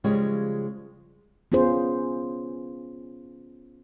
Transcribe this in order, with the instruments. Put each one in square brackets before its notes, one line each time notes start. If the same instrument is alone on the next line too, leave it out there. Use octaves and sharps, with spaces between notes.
[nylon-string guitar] C#3 F3 G3 G#3 G4 C#5
[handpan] B3 C#4 F4 G#4 C5